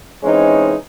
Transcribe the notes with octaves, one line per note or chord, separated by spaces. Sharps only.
E3 G#3 C4 C#4 D#4